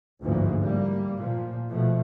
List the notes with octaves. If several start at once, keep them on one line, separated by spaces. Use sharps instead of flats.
G1 D2 G#2 E3 F3 A#3
G3 A#3
A#2 F3
B2 F3 A3